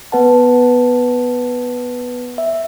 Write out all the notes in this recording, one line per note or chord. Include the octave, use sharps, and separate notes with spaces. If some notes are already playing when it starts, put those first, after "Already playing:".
B3 B4 F#5 A5
E5